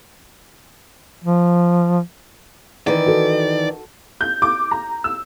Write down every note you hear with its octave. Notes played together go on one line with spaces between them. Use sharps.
F3
D#3 E3 D5
F#4 A4
G6
D6
A#5
E6